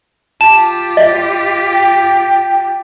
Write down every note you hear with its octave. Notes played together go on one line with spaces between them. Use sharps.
F4 G4 A5
D#5
G5